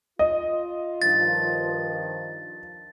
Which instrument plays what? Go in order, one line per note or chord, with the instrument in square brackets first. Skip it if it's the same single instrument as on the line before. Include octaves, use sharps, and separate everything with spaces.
[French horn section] F4 [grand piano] D#5
[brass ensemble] G2 D#3 F3 [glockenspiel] A6